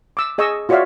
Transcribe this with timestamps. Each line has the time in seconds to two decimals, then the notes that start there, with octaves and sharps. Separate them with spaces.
0.17 D6 E6
0.38 G#4 D#5 G#5 C#6 E6
0.69 F4 F#4 C#5 D5 E5 F5